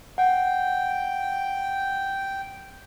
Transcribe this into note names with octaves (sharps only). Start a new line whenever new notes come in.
F#5 G5